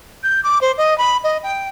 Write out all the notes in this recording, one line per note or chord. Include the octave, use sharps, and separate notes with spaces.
G6
D6
C5
D#5
B5
D#5
G5